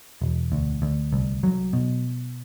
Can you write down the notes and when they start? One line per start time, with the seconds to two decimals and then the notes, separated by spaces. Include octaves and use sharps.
0.22 E1
0.52 D2
0.82 D2
1.12 C2
1.43 F#3
1.73 B2